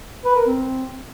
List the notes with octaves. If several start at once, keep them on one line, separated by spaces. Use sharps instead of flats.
B4
A#4
C4